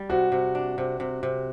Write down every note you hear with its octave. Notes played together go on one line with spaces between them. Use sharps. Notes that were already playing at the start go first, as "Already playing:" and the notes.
Already playing: G3
C3 F#4
C3
D4
C3
C3
C3